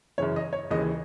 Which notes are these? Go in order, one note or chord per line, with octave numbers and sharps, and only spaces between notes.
F#2 C#3 E3 C#5
D#5
C#5
D#2 C#3 E3 D#5